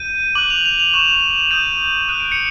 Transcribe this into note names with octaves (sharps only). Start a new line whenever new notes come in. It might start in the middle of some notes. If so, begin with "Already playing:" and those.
Already playing: G6 D#7
D6 F#6 F#7
F7
F7
F7
C#6 F#6 E7
D#6 G6 D#7
D#6 F#6 D#7
D7
C#7